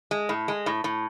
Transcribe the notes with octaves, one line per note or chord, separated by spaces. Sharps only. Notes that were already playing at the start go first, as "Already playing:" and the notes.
G#3
A2
G#3
A2
A2